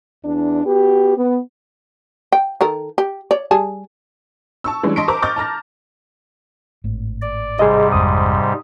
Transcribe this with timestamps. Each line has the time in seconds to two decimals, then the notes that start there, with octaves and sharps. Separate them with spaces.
0.24 E2 D4
0.65 B3 F#4 G4
1.16 B3
2.32 G5
2.61 D#3 A4 A#4
2.98 G4
3.31 C#5 D5
3.51 G3 G#4 A5
4.64 A5 C#6 E6
4.83 E3 G3 G#3 C#4 D4
4.96 D#5 A5 C6 C#6 B6 D7
5.08 A#4 C5 A5 A#5 D6
5.22 D#5 C#6 D6 F6 G6 A6
5.36 A5 A#5 F6 A6 A#6
6.84 G#1 A2
7.22 D5
7.59 G#2 C3 G3 G#4 D#5
7.92 G#1 F2 G#3 D#6